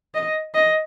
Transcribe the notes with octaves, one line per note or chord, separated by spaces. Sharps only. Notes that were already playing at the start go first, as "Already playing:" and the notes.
D#5
D#5